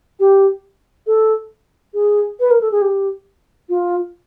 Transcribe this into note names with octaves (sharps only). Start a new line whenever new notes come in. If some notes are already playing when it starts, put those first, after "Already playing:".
G4
A4
G#4
B4
A#4
A4
G#4
G4
F4